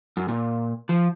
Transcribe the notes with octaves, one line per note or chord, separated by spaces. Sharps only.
F#2
A#2
F3